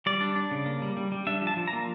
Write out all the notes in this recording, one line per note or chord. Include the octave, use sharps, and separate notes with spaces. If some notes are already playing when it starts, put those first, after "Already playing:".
G3 D5
D4
D4
C#3
A#3
G3
G3
G3
D4 E5
F3
A5
F3
A#5
A#3